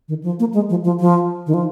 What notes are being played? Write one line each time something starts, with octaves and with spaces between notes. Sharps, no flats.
D#3
F3
A#3
G#3
F3
F3
F3
D#3
F3